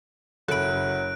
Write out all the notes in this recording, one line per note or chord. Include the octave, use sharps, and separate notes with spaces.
F#1 F#3 A4 B5 F#6 D7